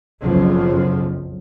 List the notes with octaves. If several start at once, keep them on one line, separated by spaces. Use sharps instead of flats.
F#1 B1 F2 C#3 F3 F#3